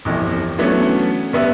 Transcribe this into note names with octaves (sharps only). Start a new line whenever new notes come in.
G1 C2 F2 E3
E3 F#3 A3 B3 C#4 D4
G2 B3 E5